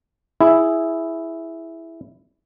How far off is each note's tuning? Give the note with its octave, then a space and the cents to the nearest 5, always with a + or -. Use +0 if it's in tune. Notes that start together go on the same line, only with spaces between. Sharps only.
E4 +0 G#4 +0